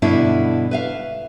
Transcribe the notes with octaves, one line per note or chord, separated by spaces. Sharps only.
G2 B2 D3 D4 E4
B4 E5 F5